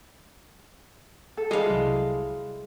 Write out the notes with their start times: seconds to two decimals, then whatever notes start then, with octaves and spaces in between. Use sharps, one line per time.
1.37 A4
1.51 G3 G#3 E4 F5
1.70 C2 C3 F#3